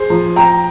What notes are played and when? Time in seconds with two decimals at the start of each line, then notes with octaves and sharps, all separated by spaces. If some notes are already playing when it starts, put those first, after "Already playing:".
Already playing: G#4 C5
0.10 F3
0.36 F3 G5 A#5